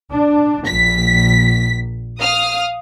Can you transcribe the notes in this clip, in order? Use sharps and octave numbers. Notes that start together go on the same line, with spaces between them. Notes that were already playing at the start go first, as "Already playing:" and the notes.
D4
A#1 B6
F5 D#6 F6